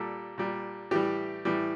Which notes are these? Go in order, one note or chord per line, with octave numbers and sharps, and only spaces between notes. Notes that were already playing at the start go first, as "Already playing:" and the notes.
Already playing: A#2 G3 A4
A#2 G3
A2 E3 G3 G4
A2 E3 G3